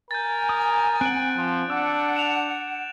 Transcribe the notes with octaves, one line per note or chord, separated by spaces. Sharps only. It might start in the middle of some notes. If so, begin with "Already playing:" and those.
A#4 G#5 G6 A6
D#6
C4 F#5 F#6 D7
F3
D4 F#5 E6
E7 F7